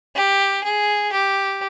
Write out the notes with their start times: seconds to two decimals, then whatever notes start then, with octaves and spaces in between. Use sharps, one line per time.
0.15 G4
0.63 G#4
1.12 G4